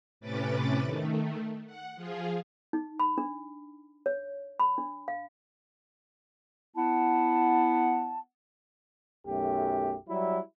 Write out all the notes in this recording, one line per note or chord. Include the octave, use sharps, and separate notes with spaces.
A2 C3 C#4 B4 D6 A6
D#3 A3
F#5
F3 F4 G#4
D#4
B5
D4
C#5
B5
D4
F5
B3 E4 F#5 A5
B1 F#2 A3 G4
F#3 G3 E4